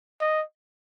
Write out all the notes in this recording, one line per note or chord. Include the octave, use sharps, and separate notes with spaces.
D#5